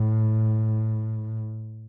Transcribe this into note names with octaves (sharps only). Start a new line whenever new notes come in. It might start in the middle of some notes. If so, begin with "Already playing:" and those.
Already playing: A2